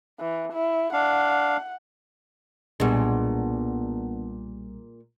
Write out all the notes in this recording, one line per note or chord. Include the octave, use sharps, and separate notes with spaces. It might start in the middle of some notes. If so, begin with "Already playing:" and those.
E3
E4
D4 F5 F#5
B1 A#2 G3 G#3 B3 D4